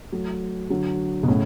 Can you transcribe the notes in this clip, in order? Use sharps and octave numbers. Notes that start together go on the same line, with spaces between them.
F#3 A3
D3 F#3
B2
A2 C#3